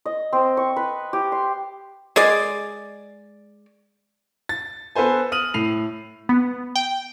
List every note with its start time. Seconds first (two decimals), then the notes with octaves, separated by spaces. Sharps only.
0.05 D#5
0.33 C4
0.57 C#6
0.76 B4
1.13 G4
1.32 C6
2.16 G#3 G#4 D5
4.49 A6
4.95 B3 A4 B4 C5 G#5
5.32 D#6 F6 D#7 F7 F#7
5.54 A2 C7 F7
6.29 B3
6.76 G5